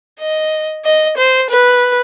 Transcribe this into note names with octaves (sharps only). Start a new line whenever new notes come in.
D#5
D#5
C5
B4